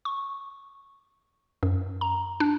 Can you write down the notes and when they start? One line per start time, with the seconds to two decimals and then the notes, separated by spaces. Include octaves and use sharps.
0.05 C#6
1.63 F#2
2.01 A#5
2.40 D4